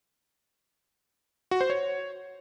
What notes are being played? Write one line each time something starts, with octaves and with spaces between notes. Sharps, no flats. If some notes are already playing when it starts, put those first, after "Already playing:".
F#4
C5
C#5